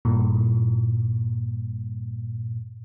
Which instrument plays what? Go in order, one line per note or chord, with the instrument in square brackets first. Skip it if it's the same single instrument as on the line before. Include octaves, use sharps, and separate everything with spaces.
[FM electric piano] G2 A#2